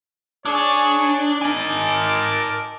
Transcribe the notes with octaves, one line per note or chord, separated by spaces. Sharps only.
D4 G#4 C#5
D#4 A#4 G#5 A5 D6